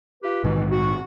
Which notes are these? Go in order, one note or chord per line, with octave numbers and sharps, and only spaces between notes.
F4 G4 B4
A#1 G#2 B2 D#3 E3
F#4